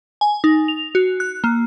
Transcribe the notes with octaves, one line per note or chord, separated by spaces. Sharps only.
G#5
D#4
F7
F#4
F#6
A#3